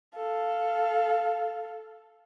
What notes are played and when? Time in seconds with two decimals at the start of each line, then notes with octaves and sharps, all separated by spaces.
0.15 A4 F5